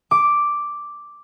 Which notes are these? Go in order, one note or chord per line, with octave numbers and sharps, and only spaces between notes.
D6